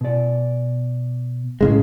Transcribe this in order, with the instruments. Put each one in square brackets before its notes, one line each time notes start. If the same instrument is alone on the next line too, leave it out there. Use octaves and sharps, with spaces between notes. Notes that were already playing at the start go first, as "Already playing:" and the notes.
[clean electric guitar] B2 D5
[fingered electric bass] A2 C#3 G#3